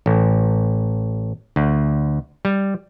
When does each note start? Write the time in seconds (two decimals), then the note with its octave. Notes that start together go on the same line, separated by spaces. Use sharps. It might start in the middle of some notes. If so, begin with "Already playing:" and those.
0.06 A1
1.56 D2
2.45 G3